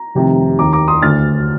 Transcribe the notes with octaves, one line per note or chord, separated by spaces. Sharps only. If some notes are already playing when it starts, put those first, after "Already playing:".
Already playing: A#5
F1 F2 C3 D#3
D#2 D#3 A#5 D6
A#5 D6
C6 D#6
D2 D3 F6 A6